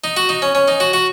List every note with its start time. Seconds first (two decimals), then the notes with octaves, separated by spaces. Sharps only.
0.04 D#4
0.17 F#4
0.29 D#4
0.42 C#4
0.55 C#4
0.68 D#4
0.80 F#4
0.93 F#4